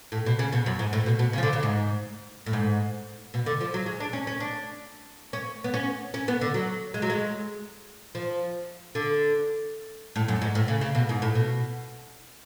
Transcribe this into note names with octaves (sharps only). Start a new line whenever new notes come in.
A2
B2
C#3
B2
F#2
G#2
A2
B2
B2
C#3
F3
D3
C#3
G#2
A2
G#2
B2
D3
F3
F#3
G#3
D4
C#4
C#4
D4
C#4
B3
C#4
C#4
B3
D3
F#3
G#3
F#3
G#3
F3
D3
A2
F#2
G#2
A2
C#3
C#3
B2
G#2
A2
B2